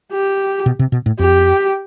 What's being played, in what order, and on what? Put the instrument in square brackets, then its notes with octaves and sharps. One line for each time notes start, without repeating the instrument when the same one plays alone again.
[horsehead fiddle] G4
[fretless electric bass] B2
C3
B2
A2
[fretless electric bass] F2 [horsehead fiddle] G4